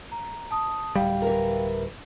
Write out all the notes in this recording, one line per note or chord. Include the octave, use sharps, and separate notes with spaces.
A#5
A5 D#6
D1 B1 G3 F5 G5
E3 A#4